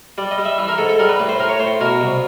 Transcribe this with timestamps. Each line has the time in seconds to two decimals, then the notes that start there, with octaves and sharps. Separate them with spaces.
0.18 G3 D5
0.31 D#5
0.38 G3
0.45 E5
0.58 E3 E5
0.68 A#4
0.78 G#2 A4
0.89 A4
0.99 G3 A#4
1.09 B4
1.19 A2 B4
1.29 C5
1.39 A2 A#4
1.49 C#5
1.60 A2 C5
1.81 B2 A#4
2.01 C2